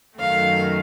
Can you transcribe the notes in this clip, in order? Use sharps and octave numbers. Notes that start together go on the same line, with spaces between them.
F#2 D#3 A3 F5